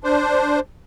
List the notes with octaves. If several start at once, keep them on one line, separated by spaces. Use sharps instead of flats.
D4 C5